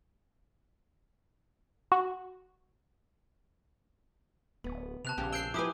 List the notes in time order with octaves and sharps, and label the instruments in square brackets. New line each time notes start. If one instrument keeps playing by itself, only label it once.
[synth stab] F#4
[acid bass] D1 [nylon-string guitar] B3
[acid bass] C3 [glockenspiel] A5 F#6 F7
[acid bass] A#1 [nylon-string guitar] C#3 [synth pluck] G4
[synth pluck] E6 C7 [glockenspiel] G6 D7 G7
[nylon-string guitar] F3 B4 [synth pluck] E4 G4 G#5 [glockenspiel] D6 D#6